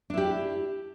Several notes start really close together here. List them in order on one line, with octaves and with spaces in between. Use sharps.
D4 E4 G4